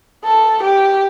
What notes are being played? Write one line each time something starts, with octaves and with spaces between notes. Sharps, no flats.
A4
G4